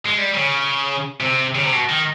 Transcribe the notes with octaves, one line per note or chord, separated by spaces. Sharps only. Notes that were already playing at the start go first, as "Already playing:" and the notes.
G#3
G3
C#3
C3
C#3
C3
B2
D#3